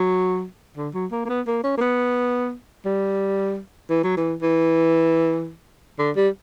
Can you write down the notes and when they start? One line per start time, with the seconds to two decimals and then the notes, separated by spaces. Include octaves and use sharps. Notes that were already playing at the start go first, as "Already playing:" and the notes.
Already playing: F#3
0.77 D3
0.94 F#3
1.12 A#3
1.25 A#3
1.29 B3
1.47 A#3
1.63 C#4
1.77 A#3
1.81 B3
2.85 G3
3.90 E3
4.03 F#3
4.16 E3
4.42 E3
5.98 D3
6.16 G3